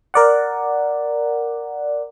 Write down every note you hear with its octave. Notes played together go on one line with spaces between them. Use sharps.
A#4 D5 F#5